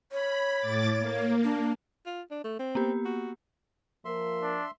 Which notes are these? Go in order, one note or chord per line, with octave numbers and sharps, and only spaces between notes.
C#5 B5
A2 D6 A6
A#3
D4
F4
D4
A3
C4
A#3 B3 G4
F#4
F3 A#3 A#4 E5 C6
D4